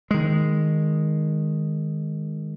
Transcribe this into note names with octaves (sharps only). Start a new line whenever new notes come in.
D#3 G#3